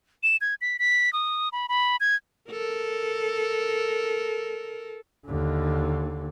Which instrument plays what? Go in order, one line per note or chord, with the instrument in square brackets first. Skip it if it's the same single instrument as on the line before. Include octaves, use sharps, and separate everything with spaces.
[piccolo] E7
G#6
B6
B6
D#6
B5
B5
G#6
[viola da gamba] A4 A#4
[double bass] D#2 D3